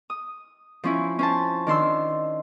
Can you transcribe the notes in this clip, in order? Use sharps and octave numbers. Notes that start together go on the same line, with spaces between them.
D#6
F3 C#4 E4
C#4 C5 A5
D#3 D4 C6 E6